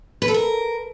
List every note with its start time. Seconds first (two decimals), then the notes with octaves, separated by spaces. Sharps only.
0.22 B4
0.28 A4
0.34 A#4